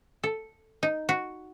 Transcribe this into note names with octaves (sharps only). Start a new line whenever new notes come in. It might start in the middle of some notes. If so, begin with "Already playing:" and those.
A4
D#4
F#4